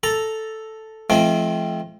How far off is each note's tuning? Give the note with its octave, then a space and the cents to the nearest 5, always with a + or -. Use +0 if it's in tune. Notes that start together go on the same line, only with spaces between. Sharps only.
A4 +0 A#5 +0
F3 -35 A3 -45 C4 +0